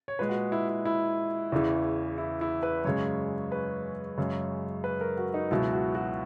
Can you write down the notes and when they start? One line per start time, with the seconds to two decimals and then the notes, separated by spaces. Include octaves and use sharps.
0.08 C#5
0.19 A#2 G#3 B4
0.29 F#4
0.36 G#4
0.52 E4
0.69 E4
0.85 E4
1.52 E2 C#3 E3
2.18 E4
2.41 E4
2.63 B4
2.85 F#2 C#3 G#3 C#5
3.52 B4
4.17 F#2 C#3 G#3 C#5
4.84 B4
5.01 A#4
5.18 F#4
5.34 D#4
5.51 C#2 B2 F#3 E4
5.73 F#4
5.95 F#4